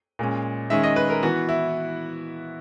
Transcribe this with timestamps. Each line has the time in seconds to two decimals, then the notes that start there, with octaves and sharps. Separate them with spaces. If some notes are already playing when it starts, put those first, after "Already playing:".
0.19 A#2 G#3 C#4
0.70 D#3 G#3 C#4 E5
0.83 D#5
0.96 B4
1.10 A#4
1.23 E3 B3 F#4
1.49 E4